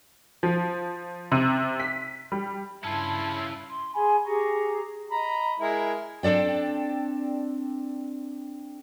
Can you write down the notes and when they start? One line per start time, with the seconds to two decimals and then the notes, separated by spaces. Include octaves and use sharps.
0.43 F3
1.32 C3
1.80 B6
2.32 G3
2.84 G2 C#3 C#4 E4 F4 A5
3.69 C6
3.94 G#4 G#5 B5 C6
4.25 G4 G#4 A#5 C#6
5.11 D#5 A#5 B5
5.60 G#3 E4 A#4
6.23 C4 D4 A4 D5 G5